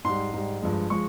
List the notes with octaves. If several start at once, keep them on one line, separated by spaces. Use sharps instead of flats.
G#2 G3 C6
G#2 G3
G2 F3 G#3
F3 G#3 C#6